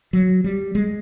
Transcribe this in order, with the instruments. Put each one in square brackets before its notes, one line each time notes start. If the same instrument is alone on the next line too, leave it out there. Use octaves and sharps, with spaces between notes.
[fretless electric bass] F#3
G3
G#3